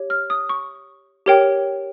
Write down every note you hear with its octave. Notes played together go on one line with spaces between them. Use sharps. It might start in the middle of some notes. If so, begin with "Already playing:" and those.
Already playing: G4 C#5
F6
D#6
C#6
G4 A#4 C#5 G5